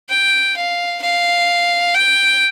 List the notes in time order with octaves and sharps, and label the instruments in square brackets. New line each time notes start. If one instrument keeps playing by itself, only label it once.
[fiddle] G5
F5
F5
G5